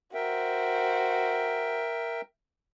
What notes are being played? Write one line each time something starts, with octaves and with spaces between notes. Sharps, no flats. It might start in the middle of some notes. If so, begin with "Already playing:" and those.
F#4 A#4 C5 E5 G5